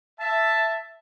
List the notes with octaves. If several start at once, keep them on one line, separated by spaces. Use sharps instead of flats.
E5 A5